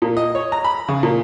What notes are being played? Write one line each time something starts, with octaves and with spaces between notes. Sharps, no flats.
A#2
D#5
C#5
A#5
B5
C#3
A#2